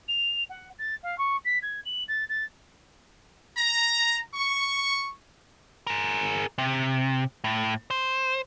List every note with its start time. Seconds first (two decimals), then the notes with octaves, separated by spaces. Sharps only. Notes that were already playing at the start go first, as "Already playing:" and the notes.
0.08 F7
0.49 F#5
0.78 A6
1.03 F5
1.18 C#6
1.44 B6
1.62 G#6
1.85 F#7
2.08 A6
2.29 A6
3.58 A#5
4.35 C#6
5.87 G#4 A#4
6.58 C3
7.44 A2
7.90 C5